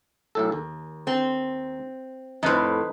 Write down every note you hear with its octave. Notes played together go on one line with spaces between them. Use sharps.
B1 A2 A4
D#2
C4
F2 A2 D#4 B4 C5